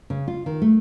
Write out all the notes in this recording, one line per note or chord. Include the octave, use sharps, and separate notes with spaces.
C#3
F4
D#3
A3